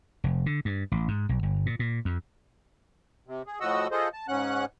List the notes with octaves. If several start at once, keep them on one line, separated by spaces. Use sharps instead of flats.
F1
D3
G2
A1
G#2
B1
G1
A#2
A#2
F2
C3
G#4
A2 F3 F#4 D#5 F#5 E6
F4 G#4 A4 C5 D#5
A5
G#2 C#3 C#4 F#5 F#6